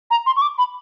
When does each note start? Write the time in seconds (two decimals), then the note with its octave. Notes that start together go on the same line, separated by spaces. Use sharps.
0.11 A#5
0.26 C6
0.36 C#6
0.42 D6
0.58 B5